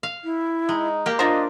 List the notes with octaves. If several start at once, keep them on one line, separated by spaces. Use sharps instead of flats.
F5
E4
G#3 D#4
A#3 G4
D4 F4 A#4 C5 D#5